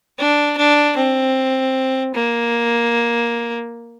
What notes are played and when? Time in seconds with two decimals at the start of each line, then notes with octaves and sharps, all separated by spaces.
0.19 D4
0.57 D4
0.97 C4
2.14 A#3